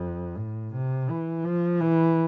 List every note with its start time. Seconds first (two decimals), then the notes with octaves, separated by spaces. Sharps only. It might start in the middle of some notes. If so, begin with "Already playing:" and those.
Already playing: F2
0.38 A2
0.73 C3
1.09 E3
1.44 F3
1.80 E3